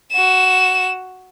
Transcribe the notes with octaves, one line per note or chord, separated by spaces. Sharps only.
F#4 E7